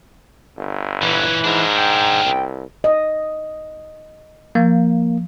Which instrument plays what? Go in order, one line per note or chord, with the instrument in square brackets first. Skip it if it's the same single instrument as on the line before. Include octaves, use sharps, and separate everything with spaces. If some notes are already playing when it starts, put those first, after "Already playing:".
[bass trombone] G1
[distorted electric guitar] A#2 C#4 [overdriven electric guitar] E3
[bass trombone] G#2 [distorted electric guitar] D4 A#4
[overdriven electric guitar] G5
[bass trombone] C2
[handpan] D#5
[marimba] F3 [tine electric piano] A#3